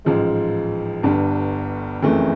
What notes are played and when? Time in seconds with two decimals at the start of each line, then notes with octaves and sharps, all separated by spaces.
0.05 A1 G#2 F3 G#3
1.03 G1 G2 D3
2.03 F#1 F2 C#3 E3 A3